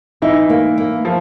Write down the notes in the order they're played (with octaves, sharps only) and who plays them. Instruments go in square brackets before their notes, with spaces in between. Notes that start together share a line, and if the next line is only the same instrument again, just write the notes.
[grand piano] E3 E4 [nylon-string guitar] D#4
[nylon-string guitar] A#3
A#3
[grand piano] F3